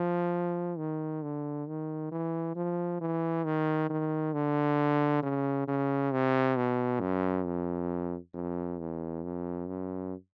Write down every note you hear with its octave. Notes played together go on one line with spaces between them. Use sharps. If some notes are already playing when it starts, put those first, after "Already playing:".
Already playing: F3
D#3
D3
D#3
E3
F3
E3
D#3
D#3
D3
C#3
C#3
C3
B2
F#2
F2
F2
E2
F2
F#2